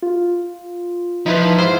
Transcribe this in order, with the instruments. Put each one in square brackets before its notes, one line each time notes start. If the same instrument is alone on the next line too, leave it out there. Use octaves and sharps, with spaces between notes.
[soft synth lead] F4
[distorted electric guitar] F3 [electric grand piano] D#4 E4 B4 [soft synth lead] B6
[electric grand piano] G#2 E4 F4 [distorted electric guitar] C5